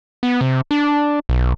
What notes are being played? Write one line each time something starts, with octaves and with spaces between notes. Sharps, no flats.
B3
C3
D4
B1